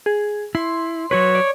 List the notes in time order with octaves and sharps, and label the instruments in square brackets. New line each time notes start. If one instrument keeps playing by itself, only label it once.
[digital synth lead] G#4
[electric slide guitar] E4 [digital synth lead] C6
[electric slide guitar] F#3 F#4 B4 [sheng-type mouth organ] C#5
[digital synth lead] D5